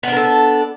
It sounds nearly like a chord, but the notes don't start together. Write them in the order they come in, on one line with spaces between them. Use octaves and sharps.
B3 D4 A#4 A4